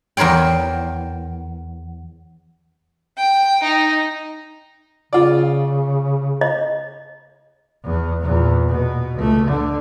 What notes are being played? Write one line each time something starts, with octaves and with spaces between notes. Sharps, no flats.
E2 A#4 C5 C#5 G5
G5
D#4
C#3 F4 D5
D#5
E2
E2 A#2
B2
C#2 A3
D3